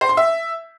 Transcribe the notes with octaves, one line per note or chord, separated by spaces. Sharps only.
C5
C6
E5